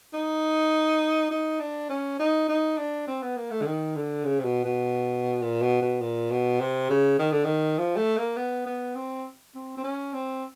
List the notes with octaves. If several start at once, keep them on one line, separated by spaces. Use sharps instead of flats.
D#4
D#4
D4
C#4
D#4
D#4
D4
C4
B3
A#3
A3
D3
D#3
D3
C#3
C3
B2
B2
A#2
B2
B2
A#2
B2
C3
C#3
D#3
D3
D#3
F3
A3
A#3
B3
B3
C4
C4
C4
C#4
C4